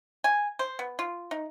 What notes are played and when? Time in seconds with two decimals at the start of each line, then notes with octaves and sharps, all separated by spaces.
0.24 G#5
0.59 C5
0.79 B3
0.99 F4
1.31 D#4